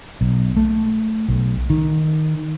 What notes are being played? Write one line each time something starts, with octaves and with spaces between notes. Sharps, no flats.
B1
A3
B1
D#3